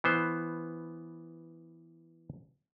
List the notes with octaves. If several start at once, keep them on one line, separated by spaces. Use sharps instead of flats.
E3 B3 C5